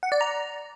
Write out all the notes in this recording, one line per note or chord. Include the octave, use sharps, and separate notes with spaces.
F#5
D5
A#5